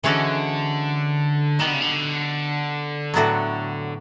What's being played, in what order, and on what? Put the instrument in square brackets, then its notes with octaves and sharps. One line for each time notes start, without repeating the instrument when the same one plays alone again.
[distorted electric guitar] D3 [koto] E3 G#3 C#4 F#4 A4
[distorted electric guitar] D#3 [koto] G3 B3 D#4 F#4
[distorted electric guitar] D3
C#3
D3
[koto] A2 F#3 B3 D4 F#4